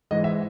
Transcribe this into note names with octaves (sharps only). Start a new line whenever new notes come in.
G#2 E3 G#3 D#5
E5